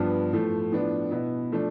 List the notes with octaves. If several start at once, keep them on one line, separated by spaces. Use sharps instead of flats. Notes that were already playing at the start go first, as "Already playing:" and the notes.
Already playing: G2 F3 B3 D4
A2 F3 A3
A2 F3 B3 D4
B2 B3 E4
F3 A3 D4